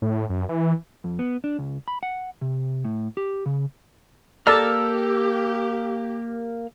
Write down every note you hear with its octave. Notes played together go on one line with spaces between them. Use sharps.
A2
F#2
E3
F2
B3
D4
C#2
B5
F#5
C3
A2
G4
C#3
A#3 G4 A4 A#4 D5 A5 A#5 F6